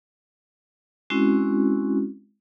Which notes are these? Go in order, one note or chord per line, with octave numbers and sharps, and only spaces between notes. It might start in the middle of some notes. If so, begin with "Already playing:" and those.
G#3 C4 C#4 E4 F#4